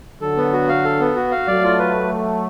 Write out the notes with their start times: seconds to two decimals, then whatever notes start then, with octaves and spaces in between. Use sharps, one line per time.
0.21 D3 F#3 A4
0.37 B3
0.53 F#4
0.69 F5
0.84 A4
1.00 B3
1.16 F#4
1.31 F5
1.48 F#3 A3 D5
1.64 F4
1.79 B4